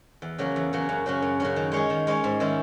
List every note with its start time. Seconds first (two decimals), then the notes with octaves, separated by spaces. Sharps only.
0.22 E2
0.38 C#3 F#3 A#3 C#4
0.56 E2
0.73 C#3 F#3 A#3 C#4
0.89 F#2
1.06 C#3 F#3 C#4
1.22 F#2
1.40 C#3 F#3 C#4
1.56 D#3
1.72 G#3 C#4 G#4 C#5
1.90 D#3
2.07 G#3 C#4 G#4 C#5
2.24 G#2
2.40 D#3 G#3 C#4 E4